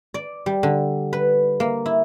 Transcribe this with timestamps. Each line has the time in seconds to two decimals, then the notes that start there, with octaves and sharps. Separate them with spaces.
0.14 D5
0.46 G3
0.63 D3
1.13 B4
1.60 A#3
1.86 E4